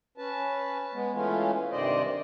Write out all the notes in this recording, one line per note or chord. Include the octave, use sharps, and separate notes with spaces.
C#4 B4 A5
G#3 B3
E3 G#3 A3 C#4 F4
G2 C3 D#3 C5 D5 D#5